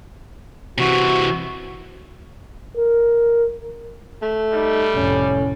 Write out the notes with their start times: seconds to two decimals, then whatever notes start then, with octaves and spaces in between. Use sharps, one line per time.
0.78 C3 E3 F#4
2.76 A#4
4.22 A3
4.53 G3 D#4
4.96 F1 A2 C#4